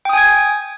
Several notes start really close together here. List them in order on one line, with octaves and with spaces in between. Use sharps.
G5 D#6 G#5 G#6